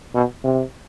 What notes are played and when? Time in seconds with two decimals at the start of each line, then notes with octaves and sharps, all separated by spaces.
0.14 B2
0.44 C3